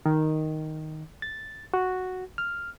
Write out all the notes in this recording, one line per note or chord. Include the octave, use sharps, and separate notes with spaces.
D#3
A6
F#4
F6